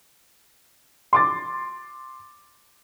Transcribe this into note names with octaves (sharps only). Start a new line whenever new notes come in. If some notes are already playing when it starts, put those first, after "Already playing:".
C6 D6 A6